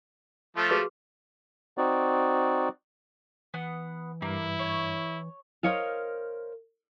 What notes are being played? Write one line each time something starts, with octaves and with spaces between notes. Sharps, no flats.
F3 A3 F4
F#4 G#4 B4
C4 D#4 F#4 D5
E3 B3 F#5
G2 A#3 E4
C#5
A#4 C5 C#5 D#5 F5